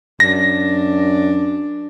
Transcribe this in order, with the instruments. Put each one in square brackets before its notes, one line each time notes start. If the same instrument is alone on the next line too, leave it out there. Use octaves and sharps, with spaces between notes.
[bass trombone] F#2 [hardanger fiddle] D4 [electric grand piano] A#6